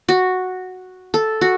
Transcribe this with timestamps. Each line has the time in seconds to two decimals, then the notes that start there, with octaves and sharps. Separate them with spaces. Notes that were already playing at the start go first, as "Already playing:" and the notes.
0.09 F#4
1.14 A4
1.41 F#4